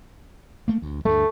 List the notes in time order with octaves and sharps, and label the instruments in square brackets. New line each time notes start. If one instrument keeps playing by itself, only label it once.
[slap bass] A3 A#3
D2
[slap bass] D2 G2 G#3 [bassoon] A3